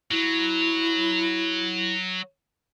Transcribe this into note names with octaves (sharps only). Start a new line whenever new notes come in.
F#3 E4